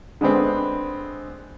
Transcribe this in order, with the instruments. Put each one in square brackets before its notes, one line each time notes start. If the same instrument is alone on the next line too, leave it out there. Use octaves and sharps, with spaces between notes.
[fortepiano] D3 G#3 B3 C4